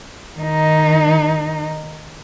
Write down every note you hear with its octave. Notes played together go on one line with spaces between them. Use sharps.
D#3 D#4